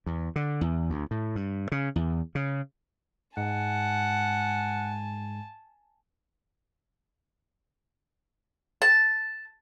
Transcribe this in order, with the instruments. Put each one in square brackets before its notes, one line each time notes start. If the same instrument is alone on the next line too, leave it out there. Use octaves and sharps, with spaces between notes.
[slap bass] E2
D3
E2
D2
A2
G2
C#3
E2
C#3
[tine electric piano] G#2 G#3 [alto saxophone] F#5 [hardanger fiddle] G#5 A5
[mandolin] A5